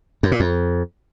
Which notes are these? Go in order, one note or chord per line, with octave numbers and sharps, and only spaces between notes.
F#2
A#2
F2